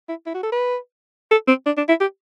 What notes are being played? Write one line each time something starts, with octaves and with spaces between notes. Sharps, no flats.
E4
E4
F#4
A4
B4
A4
C4
D4
D4
E4
G4